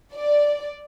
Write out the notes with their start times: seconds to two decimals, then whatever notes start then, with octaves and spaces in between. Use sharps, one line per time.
0.14 D5